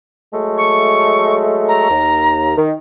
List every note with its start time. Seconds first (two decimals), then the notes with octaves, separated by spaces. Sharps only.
0.34 F#3 G#3 A3
0.58 C#6
1.68 A#5
1.90 D#2
2.57 D#3